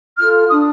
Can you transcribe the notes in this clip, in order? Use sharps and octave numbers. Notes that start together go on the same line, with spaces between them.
F4 A4 F6
D4 D#6